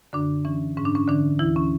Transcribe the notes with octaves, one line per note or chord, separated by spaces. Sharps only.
F#2 D3 D4
E3 C#4
G#2 C#4
D4
C#4
D3 E3 D4
D2 E3 E4
C#4